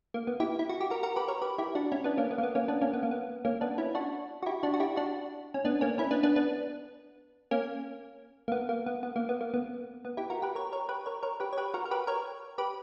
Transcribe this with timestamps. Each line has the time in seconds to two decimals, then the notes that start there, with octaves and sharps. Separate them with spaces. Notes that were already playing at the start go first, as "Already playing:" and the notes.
0.14 A#3
0.27 B3
0.40 E4 G4
0.59 E4
0.69 F#4
0.81 G4
0.90 F#4 A#4
1.03 F#4 A#4
1.16 G4 B4
1.28 A#4 C#5
1.42 G4 B4
1.58 E4 G4
1.75 D4 F#4
1.92 C#4 E4
2.04 B3 D4
2.17 A#3 C#4
2.31 B3
2.38 A#3
2.43 B3
2.55 A#3 C#4
2.68 B3 D4
2.81 A#3 C#4
2.93 B3
3.03 A#3
3.11 B3
3.45 A#3 C#4
3.61 B3 D4
3.78 C#4 E4
3.95 D4 F#4
4.43 F#4
4.46 E4 G4
4.63 D4 F#4
4.74 F#4
4.80 E4 G4
4.96 D4 F#4
5.54 C#4
5.65 B3 D4
5.81 A#3 C#4
5.98 C#4 E4
6.11 B3 D4
6.23 B3 D4
6.36 B3 D4
7.51 A#3 C#4
8.48 A#3
8.52 B3
8.69 A#3
8.86 B3
9.03 B3
9.16 A#3
9.29 B3
9.41 A#3
9.54 B3
10.05 B3
10.17 E4 G4
10.30 F#4 A#4
10.42 G4 B4
10.55 A#4 C#5
10.72 A#4 C#5
10.89 G4 B4
11.06 A#4 C#5
11.23 A#4 C#5
11.40 G4 B4
11.53 C#5
11.58 G4 B4
11.74 F#4 A#4
11.85 A#4
11.91 G4 B4
12.07 A#4 C#5
12.58 G4 B4